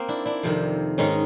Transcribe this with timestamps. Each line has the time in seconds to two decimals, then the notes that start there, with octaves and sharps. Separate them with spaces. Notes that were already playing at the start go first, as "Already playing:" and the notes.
Already playing: A#3 C4
0.08 D4 E4
0.26 D4 E4
0.43 F2 C3 D#3
0.98 G#2 D#3 C#4 D#4